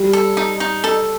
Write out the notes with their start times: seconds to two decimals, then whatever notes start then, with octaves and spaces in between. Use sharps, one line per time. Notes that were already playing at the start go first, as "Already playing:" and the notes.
Already playing: G3
0.13 A4
0.37 D#4
0.60 D#4
0.84 A4